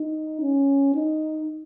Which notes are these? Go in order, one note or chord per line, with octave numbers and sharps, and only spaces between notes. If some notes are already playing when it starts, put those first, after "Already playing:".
Already playing: D#4
C#4
D#4